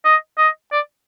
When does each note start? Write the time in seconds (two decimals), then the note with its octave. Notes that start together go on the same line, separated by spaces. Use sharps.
0.05 D#5
0.38 D#5
0.72 D5